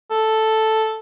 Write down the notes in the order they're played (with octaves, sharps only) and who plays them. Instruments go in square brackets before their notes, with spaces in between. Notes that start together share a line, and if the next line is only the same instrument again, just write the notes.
[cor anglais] A4